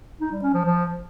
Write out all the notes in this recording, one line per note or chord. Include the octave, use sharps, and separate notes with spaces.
D#4
G3
C#4
F3
F3